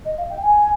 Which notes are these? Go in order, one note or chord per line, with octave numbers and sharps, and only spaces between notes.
D#5
F5
G5
G#5